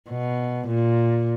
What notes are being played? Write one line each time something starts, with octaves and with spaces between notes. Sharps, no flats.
B2
A#2